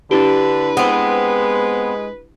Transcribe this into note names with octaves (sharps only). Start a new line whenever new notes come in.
D3 D4 E4 G4 B4
G#3 B3 C4